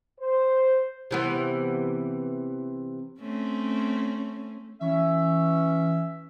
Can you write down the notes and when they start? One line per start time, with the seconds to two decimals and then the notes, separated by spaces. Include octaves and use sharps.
0.19 C5
1.11 C3 E3 B3
3.20 A3 C4 C#4
4.81 E3 C#4 E5